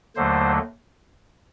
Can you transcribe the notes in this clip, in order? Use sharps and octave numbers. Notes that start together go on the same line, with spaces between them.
D#2 D3 F#3 A3 C5